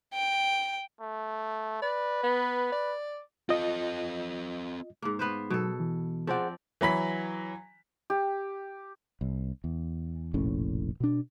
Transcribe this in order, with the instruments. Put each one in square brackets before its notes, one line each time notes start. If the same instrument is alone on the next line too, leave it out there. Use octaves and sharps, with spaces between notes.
[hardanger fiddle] G5
[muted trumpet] A3
[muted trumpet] B4 [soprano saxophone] D5
[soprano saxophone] B3
D5
[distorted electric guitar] C4 A4 [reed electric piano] F4 D#5
[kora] G#2 A#3
B3 B4 C5
[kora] B2 A4 [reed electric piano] F#3
[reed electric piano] E3
[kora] F3 C4 D5 [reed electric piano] G#4 C5 F#5
[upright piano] E3 F#3 B5 B6
[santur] G4
[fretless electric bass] C2
E2
F1 A#1 A2 C#4
B2 D4